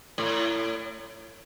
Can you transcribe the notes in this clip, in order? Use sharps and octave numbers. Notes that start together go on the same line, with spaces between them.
A2